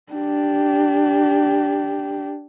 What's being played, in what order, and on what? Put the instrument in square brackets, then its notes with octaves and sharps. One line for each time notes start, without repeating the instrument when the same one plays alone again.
[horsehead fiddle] D4 G4